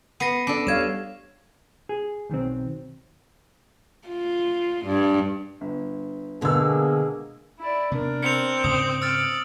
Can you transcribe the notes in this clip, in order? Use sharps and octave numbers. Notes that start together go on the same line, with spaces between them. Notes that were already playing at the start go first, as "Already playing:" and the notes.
B3 A#6 C7 D#7
D4 A4
G3 C#5 F5 G#6 E7
G#4
B1 D#3 F#3 C4
F4
G2
G1
B2 D3 G#3 A#3 G#4 E6
E4 D5
C3 B3 D4 A#4
C4 C#7 F7
G#2 C#3 D#6
D6 E6 F6 A6